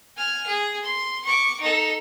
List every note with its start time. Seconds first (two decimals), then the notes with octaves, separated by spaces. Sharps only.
0.17 G#5 F6
0.47 G#4
0.83 C6
1.25 C#6 D6
1.60 D#4 A4